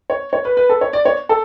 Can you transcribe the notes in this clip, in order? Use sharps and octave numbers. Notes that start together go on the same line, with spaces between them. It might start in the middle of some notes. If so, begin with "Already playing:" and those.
C#5
C#5
B4
B4
A4
C#5
D5
C#5
A4